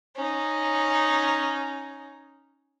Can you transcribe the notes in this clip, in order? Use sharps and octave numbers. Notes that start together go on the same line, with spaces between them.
C#4 D#4